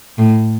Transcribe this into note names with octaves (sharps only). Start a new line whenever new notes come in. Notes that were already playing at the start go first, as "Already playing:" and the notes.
A2